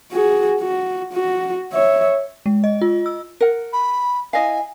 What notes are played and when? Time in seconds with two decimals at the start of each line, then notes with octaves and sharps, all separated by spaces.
0.12 F#4 G#4
0.61 F#4
1.13 F#4
1.73 C#5 E5
2.46 G#3
2.64 D#5
2.81 F4
3.06 E6
3.41 A#4 F#5
3.73 B5
4.33 E4 D#5 F5 G#5